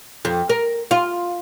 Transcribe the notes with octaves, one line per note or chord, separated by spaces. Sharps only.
F2
A#4
F4